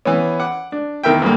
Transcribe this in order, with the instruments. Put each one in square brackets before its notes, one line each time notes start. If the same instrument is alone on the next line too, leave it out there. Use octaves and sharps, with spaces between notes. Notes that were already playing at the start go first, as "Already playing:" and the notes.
[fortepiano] E3 B3 C#4
F#5 D6
D4
E2 D#3 A#4 E5 G5
D2 G2 A#3